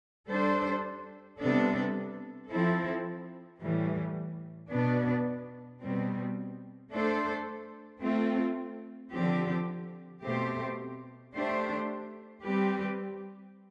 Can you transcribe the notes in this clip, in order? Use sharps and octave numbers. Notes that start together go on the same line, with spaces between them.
G3 D4 A4 C5
C3 G3 B3 D4 A4
F3 C4 E4 A4
A2 E3 G3
B2 B3 D4
B2 G3 C4
A3 D4 A4 C5
A3 C4 F4
D3 F3 C4 G4
B2 A3 C4 G4 C5
A3 D4 G4 C5
G3 C4 G4 B4